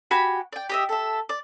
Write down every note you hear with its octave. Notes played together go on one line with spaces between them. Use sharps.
F#4 G4 G#5 B5
D5 G5
G4 D#5 E5
A4 E5
D5